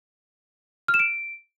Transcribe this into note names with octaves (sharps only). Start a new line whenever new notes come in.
F6
E7
D7